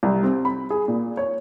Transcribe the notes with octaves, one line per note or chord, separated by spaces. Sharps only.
C2
C4
B5
G#4
A#2
C#5